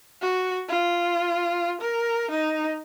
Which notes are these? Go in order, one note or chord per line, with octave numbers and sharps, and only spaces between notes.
F#4
F4
A#4
D#4